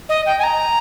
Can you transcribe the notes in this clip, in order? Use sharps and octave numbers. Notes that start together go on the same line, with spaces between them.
D#5
G5
G#5
A#5